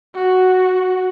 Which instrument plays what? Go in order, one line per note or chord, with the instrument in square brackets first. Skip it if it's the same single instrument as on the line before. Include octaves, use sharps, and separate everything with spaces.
[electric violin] F#4